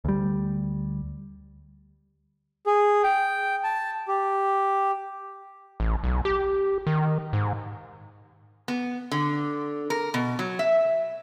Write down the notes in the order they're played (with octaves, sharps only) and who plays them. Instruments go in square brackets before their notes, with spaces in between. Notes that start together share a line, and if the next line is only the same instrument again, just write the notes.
[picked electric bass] D2 G3
[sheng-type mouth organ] G#4
G5
A5
G4
[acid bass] A1
B1
G4
D#3
G#2
[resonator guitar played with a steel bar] B3
D3
A#4
B2
F#3
E5